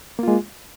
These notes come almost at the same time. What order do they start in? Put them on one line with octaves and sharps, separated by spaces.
A#3 F4 G#3